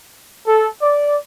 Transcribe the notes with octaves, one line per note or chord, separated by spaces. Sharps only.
A4
D5